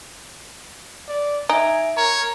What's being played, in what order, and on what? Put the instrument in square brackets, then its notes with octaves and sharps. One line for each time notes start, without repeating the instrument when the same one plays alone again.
[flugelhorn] D5
[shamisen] D#4 [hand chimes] E5 D7 [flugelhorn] G#5
[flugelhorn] A#4 [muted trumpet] C#5 [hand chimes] A#5